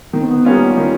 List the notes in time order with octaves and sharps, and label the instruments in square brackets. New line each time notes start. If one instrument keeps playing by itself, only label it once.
[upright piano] D#3 [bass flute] B3
[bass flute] C4
B3
[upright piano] G3 A#3 C#4 F4
D#3